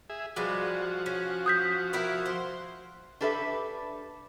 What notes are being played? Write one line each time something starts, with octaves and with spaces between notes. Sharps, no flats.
G#4 E5
F3 G3 G#3 F#4 B4
C#4
D#6 G6 B6
E4 A#4 B4
C5
D4 G4 A4 B4 C5 E5